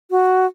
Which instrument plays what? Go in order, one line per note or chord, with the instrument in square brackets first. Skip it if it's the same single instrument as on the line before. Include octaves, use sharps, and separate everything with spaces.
[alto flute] F#4